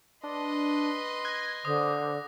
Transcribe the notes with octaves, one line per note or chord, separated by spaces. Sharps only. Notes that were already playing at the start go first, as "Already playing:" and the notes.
D4 B4 D#5 C6
F#6 G#6 A#6
D3 C5 D#6